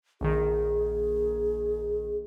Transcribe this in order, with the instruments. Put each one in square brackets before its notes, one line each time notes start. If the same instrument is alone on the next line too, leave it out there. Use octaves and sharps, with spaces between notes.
[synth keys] A#1 D#3 [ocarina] G#4